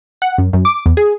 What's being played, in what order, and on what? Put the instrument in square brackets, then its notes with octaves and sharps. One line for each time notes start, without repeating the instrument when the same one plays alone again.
[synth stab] F#5
F#2
F#2
D6
E2
G#4